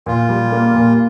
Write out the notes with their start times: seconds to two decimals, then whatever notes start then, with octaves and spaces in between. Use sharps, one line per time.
0.06 A#2 F4
0.29 G3
0.52 A#3
0.74 A#2